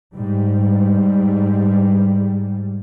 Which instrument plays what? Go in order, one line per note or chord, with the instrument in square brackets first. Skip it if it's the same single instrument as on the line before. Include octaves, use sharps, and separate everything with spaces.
[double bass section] G#2 G3